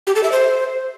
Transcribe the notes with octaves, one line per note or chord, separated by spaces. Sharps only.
G4
A4
E5
C5